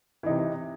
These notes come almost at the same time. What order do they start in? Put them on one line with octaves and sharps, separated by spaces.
E3 D#4 C3